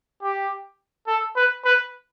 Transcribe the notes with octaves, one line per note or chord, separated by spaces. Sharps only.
G4
A4
B4
B4